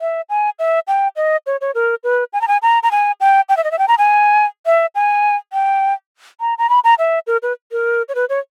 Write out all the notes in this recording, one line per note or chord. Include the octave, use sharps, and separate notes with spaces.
E5
G#5
E5
G5
D#5
C#5
C#5
A#4
B4
G#5
A#5
G#5
A#5
A#5
G#5
G5
G5
E5
D#5
E5
G5
A#5
G#5
E5
G#5
G5
A#5
A#5
B5
A#5
E5
A#4
B4
A#4
C#5
B4
C#5